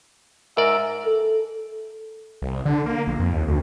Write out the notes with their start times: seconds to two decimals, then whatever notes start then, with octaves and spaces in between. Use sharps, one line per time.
0.57 G#2 A#4 D5 E5
1.06 A4
2.42 C2
2.65 D3
2.86 A#3
3.07 A#1
3.19 F2
3.33 D#2
3.47 D2